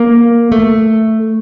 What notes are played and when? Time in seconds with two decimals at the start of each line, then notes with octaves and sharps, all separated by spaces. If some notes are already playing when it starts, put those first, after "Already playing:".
Already playing: A#3
0.52 A3